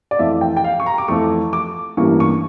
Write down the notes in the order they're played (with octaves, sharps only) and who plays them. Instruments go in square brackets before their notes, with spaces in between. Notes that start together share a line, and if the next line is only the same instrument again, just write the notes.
[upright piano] D5
F2 E3 A3 E5
G5
G5
F5
C#6
A#5
D6
F2 E3 A3 C#6
D6
A1 G2 E3 A#3 E4 C#6
C#6